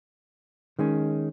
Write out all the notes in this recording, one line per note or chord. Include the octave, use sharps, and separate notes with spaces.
D#3 G#3 C#4